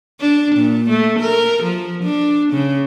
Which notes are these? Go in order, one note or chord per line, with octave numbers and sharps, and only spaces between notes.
D4
A#2
A3
A#4
F3
D4
C#3